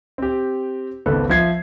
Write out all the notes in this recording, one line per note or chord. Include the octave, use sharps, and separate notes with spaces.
C4 G4
G#1 C#2 B3 A4 B4
F3 E5 G#6 C7